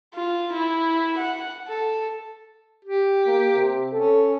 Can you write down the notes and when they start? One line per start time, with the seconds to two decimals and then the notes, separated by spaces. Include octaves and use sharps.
0.14 F4
0.52 E4
1.17 F#5
1.68 A4
2.85 G4
3.27 A#3
3.56 C3
3.93 C#4 A4